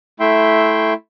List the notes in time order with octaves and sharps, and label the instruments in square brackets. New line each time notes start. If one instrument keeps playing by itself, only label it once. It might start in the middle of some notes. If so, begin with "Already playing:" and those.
[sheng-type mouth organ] A3 E4 E5 G5 C6